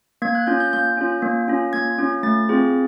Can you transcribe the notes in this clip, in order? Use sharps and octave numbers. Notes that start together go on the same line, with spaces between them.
A#3 G#6
F#6
C#4 F4 G6
G6
A#3 G6
C#4 F4
A#3
C#4 F4
A#3 G#6
C#4 F4
A3 A6
C4 F4 G#4